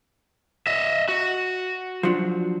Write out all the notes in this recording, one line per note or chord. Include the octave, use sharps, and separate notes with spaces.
D#5 E5
F#4
F3 F#3 D4